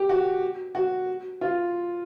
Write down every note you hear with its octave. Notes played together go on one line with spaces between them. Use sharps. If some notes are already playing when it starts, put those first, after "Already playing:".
Already playing: G4
F#4
F#4
F4